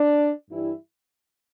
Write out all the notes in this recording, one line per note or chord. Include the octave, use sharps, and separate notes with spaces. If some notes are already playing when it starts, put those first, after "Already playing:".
Already playing: D4
G2 E3 G3 E4